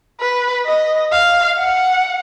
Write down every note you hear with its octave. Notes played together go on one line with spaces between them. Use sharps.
B4
D#5
F5
F#5